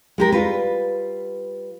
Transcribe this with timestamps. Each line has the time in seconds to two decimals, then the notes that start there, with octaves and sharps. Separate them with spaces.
0.18 G#3 G4 A#4
0.32 G3 F4 B4